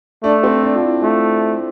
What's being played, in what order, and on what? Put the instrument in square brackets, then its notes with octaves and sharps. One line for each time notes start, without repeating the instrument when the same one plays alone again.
[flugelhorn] A3 [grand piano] D4
[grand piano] C4
D4
F4
E4
[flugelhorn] A3 [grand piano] F4